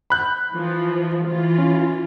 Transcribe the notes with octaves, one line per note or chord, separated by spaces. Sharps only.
B5 F#6 G6
E3 F3
E3 F4
C#4